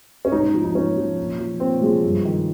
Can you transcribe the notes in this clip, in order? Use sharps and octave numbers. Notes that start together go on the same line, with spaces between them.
C#4
G#2 D#4
F3
D#4
G#2 C#4
F3
A#2
F3
A#2 C4
F3 G#3
G2
D#3